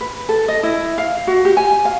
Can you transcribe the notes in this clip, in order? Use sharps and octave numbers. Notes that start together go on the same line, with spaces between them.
B4
A4
D#5
E4
F5
F#4
G4
G#5
F5